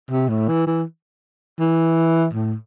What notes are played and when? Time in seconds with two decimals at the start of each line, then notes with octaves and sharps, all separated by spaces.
0.11 C3
0.29 A2
0.49 E3
0.67 E3
1.59 E3
2.33 A2